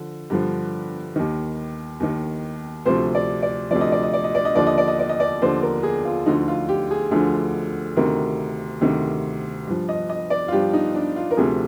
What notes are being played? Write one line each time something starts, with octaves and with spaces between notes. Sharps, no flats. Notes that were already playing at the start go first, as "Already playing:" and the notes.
Already playing: D3 F3
G2 D3 F3
D#2 D#3
D#2 D#3
D2 C3 F3 C5
D5
D5
D2 C3 F3 D5
D#5
D5
D#5
D5
D#5
D5
D#5
D#2 D3 F3 D5
D#5
D5
D#5
D5
D#5
D5
D#2 D3 F3 C5
A#4
G#4
F4
D2 D3 F3 D#4
F4
G4
G#4
D2 D3 F3 G#4
D2 C3 D#3 A#4
D2 C3 D#3
G2 F3
D#5
D#5
D5
F4
G2 F3 G4
D#4
D4
F4
A#4
D2 C3 F3 G#4